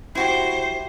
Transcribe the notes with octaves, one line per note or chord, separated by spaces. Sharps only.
E4 F#4 G4 C5